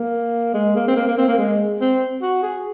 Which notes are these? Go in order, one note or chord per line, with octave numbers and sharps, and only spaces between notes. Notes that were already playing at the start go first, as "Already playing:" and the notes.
Already playing: A#3
G#3
A#3
C4
A#3
A#3
C4
A#3
G#3
C4
F#4
G#4